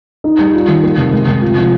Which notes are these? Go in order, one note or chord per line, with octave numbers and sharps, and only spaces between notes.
D#4
G3
F4
D#3
A#3
C3
G#3
C3
F4
F3